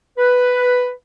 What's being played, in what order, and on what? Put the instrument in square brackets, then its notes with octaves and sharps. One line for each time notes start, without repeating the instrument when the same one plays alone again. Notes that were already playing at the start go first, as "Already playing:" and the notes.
[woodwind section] B4